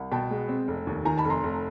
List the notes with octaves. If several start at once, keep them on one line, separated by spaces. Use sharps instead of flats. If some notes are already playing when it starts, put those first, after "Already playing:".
Already playing: C2
B2 G5 A5
G#3
C4
F1
D#2
D#3 G#5 A#5
A5 B5
F1
A#5 C6
F1